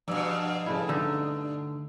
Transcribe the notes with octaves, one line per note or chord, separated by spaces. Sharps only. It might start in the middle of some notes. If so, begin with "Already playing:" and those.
G2 B2 F3 E6
C#3 A3 E4
D3 D#4 E6